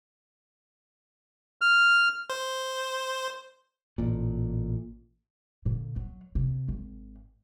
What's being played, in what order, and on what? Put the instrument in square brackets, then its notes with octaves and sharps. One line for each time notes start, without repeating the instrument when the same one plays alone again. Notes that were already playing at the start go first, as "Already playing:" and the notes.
[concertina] F6
[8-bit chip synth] C5
[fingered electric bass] A1 A#2
[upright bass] A#2 D3
F#3
C3
G#1